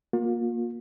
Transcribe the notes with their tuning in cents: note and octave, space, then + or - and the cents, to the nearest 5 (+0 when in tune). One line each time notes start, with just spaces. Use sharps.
A#3 +15 F4 +35